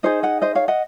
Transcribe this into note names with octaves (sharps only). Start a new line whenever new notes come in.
D#4 G#4 C5 D#5
D#5 F#5
C5 D#5
C#5 F5
D#5 F#5